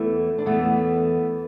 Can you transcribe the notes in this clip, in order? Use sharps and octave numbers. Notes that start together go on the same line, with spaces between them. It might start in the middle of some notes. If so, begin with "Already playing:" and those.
Already playing: E2 E3 A3
D4
E2 E3 A3 B3